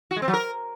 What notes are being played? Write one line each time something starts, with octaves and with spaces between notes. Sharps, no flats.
F#4
G#3
C4
F#3
A#4